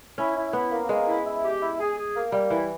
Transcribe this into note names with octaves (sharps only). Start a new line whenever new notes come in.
C#4 E4
E4
B3 E4
A#3
G#3 A#3
E4
E4
G4
E4
G#4
G#4
A#3
G3 A#3
E3 E4